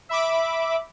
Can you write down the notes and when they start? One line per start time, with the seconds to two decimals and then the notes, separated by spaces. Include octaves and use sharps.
0.09 E5 B5 D6